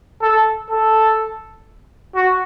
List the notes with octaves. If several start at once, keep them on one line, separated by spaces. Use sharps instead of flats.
A4
A4
F#4